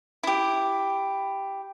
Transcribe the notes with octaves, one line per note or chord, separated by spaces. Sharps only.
E4 G4